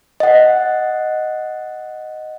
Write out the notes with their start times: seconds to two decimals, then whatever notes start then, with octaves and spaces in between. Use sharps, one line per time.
0.20 D#5 F#5